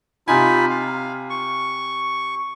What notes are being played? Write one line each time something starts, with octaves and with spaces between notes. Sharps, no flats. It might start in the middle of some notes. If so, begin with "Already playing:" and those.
C3 D#4 F4 G#5 B5
F5
C#6